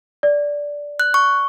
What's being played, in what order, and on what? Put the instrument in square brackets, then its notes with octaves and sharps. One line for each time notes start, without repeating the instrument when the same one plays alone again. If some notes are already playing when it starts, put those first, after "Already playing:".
[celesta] D5
[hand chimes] F#6
C#6